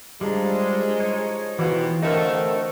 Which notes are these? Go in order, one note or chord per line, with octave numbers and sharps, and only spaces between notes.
F3 G3 G#3 D4 A#5
D#4 C#5
B2 E3 F4 G4 D6
D3 D#3 F#3 A3 C4 A4 A#4 D#5